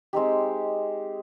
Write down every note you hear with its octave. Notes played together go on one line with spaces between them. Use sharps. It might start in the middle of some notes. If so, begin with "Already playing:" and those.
G#3 C4 D#4 G4